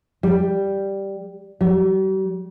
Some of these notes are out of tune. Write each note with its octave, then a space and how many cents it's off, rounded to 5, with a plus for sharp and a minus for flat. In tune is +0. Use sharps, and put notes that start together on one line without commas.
G3 +0
G3 -45